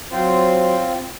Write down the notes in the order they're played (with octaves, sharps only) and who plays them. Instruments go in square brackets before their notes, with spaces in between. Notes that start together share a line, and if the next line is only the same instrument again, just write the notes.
[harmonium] F#3 C5 [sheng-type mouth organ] C4 F4